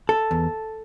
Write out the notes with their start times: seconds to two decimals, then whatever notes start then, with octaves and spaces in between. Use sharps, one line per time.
0.09 A4
0.31 E2